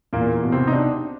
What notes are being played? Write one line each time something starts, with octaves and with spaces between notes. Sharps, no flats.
E2 A#2 A#3
B2
C3 C4
D#4
D4